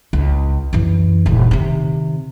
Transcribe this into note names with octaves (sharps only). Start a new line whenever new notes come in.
C#2
F#2 E3
D#1 C3
C3 D#3